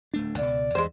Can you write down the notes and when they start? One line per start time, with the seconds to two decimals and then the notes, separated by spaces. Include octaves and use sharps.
0.14 D1 A3 D4
0.38 C#2 B2 D5
0.75 E2 G2 E3 G#3 C5